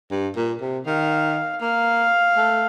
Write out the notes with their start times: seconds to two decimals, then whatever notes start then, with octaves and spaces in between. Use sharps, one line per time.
0.11 G2
0.36 A#2
0.61 C3
0.86 D#3 F5
1.61 A#3 F5
2.37 A3